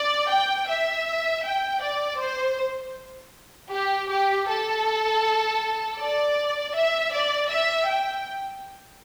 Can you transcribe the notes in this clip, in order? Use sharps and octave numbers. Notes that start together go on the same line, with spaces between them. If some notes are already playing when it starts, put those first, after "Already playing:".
Already playing: D5
G5
E5
G5
D5
C5
G4
G4
A4
D5
E5
D5
E5
G5